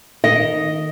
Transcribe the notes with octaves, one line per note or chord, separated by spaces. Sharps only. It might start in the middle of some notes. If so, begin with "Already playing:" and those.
D#3 D#5